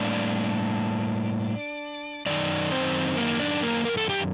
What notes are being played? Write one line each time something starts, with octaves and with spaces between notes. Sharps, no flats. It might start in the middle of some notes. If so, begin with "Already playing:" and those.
Already playing: A2 G3 A#3 D4 D5
F#2 D#3 D#4 D5
C4 C5
A#3 A#4
D4 D5
A#3 A#4
A#4
A4
G4